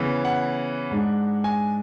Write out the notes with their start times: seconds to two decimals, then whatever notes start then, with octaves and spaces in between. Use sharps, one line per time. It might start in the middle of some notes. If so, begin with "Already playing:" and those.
Already playing: C#3 E3 B3
0.25 F#5
0.91 G#2 G#3 D4
1.44 G#5